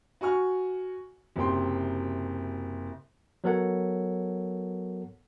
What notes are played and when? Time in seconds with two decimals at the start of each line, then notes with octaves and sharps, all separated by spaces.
0.21 F#4 G#5 C#6 F6
1.36 F#1 C3 G5 C6
3.44 F#3 B3 A4 A#4 C#5 F#5